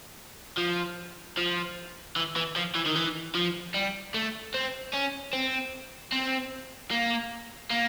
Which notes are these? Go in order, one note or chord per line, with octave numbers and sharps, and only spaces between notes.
F3
F3
E3
E3
F3
E3
D#3
E3
F3
G3
A3
C4
C#4
C4
C4
A#3
A#3